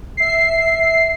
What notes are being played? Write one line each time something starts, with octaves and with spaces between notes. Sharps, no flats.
E5 C7